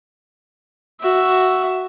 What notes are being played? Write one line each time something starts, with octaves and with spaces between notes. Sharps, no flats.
F#4 E5